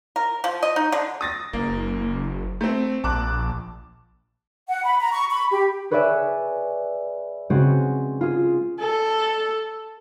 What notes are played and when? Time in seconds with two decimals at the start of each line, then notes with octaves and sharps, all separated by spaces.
0.16 A#4
0.44 F3
0.63 D#5
0.76 D#4
0.92 D3
1.21 D#6 A6 A#6
1.53 F#1 A#3
2.61 A3 C4
3.04 A#1 A5 D6 F#6
4.68 F#5
4.85 B5
5.00 A#5
5.13 C#6
5.31 B5
5.51 G4
5.91 G#4 B4 C#5 D5 E5 G#5
7.50 C#3 G#3 C4 C#4 F#4
8.21 F4 G#4
8.79 A4